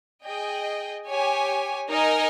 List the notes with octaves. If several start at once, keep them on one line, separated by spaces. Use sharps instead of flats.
G#4 D#5 G5
G4 C#5 G#5
D#4 A#4 D#5 G#5